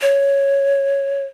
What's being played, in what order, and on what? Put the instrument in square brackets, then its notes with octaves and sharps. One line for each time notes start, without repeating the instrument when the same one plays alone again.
[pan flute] C#5